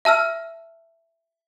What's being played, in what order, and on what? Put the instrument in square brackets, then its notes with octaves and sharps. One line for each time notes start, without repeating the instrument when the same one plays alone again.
[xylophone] E5 A5 E6 F6